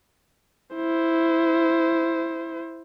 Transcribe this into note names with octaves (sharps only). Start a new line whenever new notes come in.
E4 C5